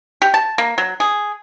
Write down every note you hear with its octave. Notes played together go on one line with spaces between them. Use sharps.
G4
A5
A#3
F#3
G#4